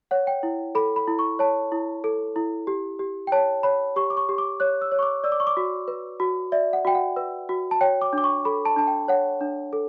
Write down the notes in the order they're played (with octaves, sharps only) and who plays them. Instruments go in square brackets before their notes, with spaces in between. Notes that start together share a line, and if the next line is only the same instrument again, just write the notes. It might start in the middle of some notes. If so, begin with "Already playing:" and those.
[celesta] C#5 F#5
G5
E4
A4 B5
B5
E4
C#6
C#5 A5
E4
A4
E4
G4
G4
G5
C#5 A5
C#5 B5
G4 C#6
D6
C#6
G4
D6
C#5 F#6
E6
C#5
C#6
D6
D5 E6
D6
C#6
D6
F#4
B4
F#4
D5 E5
F#5
F#4 G5
F#5
B4
F#4
A5
C#5 G5
D6
D4
D6
C#6
A4 B5
A5
D4 A5
G5
C#5 F#5
D4
A4